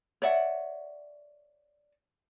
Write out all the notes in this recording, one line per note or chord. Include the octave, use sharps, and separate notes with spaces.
C#5 D5 E5 F#5